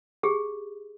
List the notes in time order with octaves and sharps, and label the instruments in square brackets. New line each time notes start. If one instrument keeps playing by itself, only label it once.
[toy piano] G4 G#4